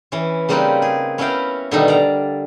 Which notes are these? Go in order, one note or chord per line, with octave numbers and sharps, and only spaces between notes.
E3 C#4
C#3 G3 A#3 C4 D#4 B4
G#4
B3 C#4 E4 F#4 F5 G5
B2 D3 D#3 G3 A3 D#4
D5 F5 A#5